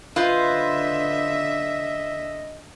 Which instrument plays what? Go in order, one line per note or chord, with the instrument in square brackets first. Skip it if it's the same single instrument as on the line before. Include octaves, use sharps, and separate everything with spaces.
[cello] D3 E5 [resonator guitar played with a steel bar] F4 [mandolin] B4 C5 [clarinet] D#5